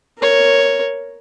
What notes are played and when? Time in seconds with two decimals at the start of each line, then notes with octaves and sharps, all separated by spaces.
0.19 A#4 C#5